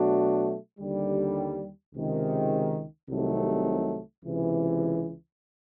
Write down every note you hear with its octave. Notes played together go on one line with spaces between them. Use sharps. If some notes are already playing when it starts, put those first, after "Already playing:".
Already playing: B2 F#3 A3 D4 F#4
D#2 D3 G3
C#2 C3 D#3 G#3
C2 C3 D#3 F#3 A3
C#2 C3 E3